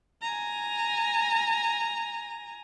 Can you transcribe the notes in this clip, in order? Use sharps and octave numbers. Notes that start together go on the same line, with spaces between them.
G#5 A#5